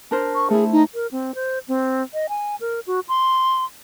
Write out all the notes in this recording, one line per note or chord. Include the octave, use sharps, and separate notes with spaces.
D4 A#4 C5
C#6
A3 E4 G#4
D#4
A#4
C4
C5
C4
D#5
G#5
A#4
F#4
C6